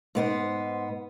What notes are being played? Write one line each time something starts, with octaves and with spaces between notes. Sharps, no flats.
G#2 B3 C5